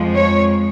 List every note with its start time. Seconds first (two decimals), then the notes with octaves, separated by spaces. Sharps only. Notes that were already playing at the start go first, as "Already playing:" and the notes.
Already playing: F2 F3 G#3
0.15 C#5